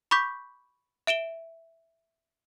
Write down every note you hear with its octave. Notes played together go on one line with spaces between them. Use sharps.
B5 C#6 D6 G6 B6
E5 D7 E7 G7